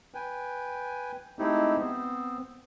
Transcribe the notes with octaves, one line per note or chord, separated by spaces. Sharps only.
B4 G5 G#5
G#3 A3 C4 D#4 E4 G4
B3 C4